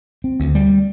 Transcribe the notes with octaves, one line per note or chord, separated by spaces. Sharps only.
C4
D2
G3